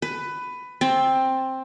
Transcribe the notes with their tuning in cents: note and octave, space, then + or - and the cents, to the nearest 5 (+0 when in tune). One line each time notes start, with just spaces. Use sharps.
B4 +15
C4 +10